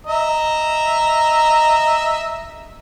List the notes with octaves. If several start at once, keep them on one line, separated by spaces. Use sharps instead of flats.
D#5 E5 A#5